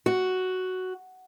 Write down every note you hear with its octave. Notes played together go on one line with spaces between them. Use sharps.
F#4